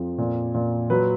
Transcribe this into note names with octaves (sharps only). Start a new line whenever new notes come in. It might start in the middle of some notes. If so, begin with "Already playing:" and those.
Already playing: F2 F3
A#2
A#2
F#3 B4